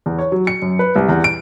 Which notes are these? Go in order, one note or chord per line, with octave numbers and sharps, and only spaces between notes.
E2
C#5
F#3
C#7
F#2
B4
C2
E2
D7